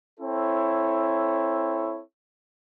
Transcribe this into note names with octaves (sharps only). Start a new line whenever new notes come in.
C4 E4 A4 C#5